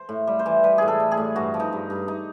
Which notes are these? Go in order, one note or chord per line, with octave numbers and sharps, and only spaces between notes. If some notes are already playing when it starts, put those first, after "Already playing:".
Already playing: C5
A2
G3
C5
E3
G3 B4
A2 G#4
A4
G3
G#4
A2
G2 F#4
F3
D#4
G2
G2
D#4